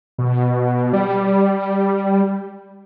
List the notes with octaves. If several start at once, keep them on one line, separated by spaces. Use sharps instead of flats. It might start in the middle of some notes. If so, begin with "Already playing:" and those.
B2
G3